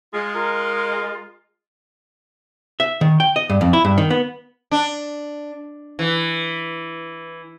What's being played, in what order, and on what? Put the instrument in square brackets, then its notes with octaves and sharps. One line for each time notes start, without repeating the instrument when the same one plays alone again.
[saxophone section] G#3 [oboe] F4
[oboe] F4 [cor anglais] A#4
[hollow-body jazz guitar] E5
D#3
G5
D#5
G2
F2
E4
G2
D#3
B3
[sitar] D4
E3